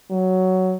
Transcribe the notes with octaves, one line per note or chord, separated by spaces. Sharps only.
F#3